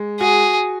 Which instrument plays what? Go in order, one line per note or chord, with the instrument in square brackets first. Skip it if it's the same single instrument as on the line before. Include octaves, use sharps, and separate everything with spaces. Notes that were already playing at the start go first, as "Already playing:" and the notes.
Already playing: [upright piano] G#3
[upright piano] F#4 [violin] G#4